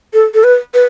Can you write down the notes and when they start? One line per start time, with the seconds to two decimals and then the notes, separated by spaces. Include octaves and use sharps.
0.14 A4
0.34 A4
0.44 B4
0.74 B4